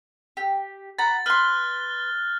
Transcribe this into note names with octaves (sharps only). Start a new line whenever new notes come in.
G4
F#5 A#5 B5 A6
B4 C6 F6 F#6 G7